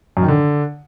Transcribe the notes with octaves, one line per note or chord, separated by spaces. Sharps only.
F#2
D#3
D3